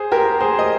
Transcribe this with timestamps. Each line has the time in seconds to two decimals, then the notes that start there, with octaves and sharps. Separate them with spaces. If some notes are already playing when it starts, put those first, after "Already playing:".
Already playing: G#4 C5
0.12 G4 A#4
0.41 G#4 C5
0.59 D#5